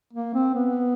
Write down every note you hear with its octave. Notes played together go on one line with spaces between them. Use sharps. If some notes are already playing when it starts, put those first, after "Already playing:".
A#3
C4
B3